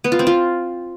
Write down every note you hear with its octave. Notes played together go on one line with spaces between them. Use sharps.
B3
F4
C4
F4